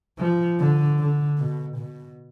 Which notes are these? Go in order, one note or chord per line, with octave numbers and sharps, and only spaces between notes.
F3
D3
D3
B2
B2